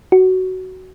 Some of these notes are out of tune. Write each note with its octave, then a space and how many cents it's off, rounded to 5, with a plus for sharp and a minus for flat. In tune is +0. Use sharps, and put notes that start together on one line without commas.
F#4 +10